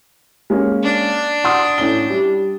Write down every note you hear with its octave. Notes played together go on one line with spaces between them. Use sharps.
G#3 A#3 C#4
D4
F#5 C6 D#6
A2 C#4 G7
G3